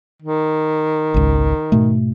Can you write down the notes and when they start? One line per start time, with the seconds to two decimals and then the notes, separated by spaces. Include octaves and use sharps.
0.22 D#3
1.14 G#1 C#2
1.72 G#2 B2 A3